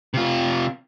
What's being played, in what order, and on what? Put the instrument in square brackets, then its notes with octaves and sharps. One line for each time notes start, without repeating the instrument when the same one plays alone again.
[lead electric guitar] C3 F4